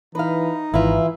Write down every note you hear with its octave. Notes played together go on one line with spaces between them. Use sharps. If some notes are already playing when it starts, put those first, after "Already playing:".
E3 D#4 B4 F5
G#1 E3 E4 F4